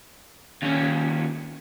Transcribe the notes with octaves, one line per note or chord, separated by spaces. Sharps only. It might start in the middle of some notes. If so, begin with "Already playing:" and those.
D#2 C#4